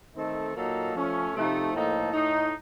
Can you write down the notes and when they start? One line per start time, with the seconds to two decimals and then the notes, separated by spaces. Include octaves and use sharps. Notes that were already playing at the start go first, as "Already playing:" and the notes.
0.15 D#3 A3 C4 D#4 A4
0.55 A#2 F#3 A#3 D#4 A4
0.95 F3 A3 C#4
1.35 C3 F3 A3 D#4
1.74 A2 F3 A#3 D#4 A4
2.13 A2 A3 D#4